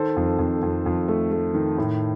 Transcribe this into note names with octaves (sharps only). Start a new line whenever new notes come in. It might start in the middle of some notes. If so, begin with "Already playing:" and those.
Already playing: D#3 A4 C5
F2
F2
F2
F2
A3
A3
D#3
A2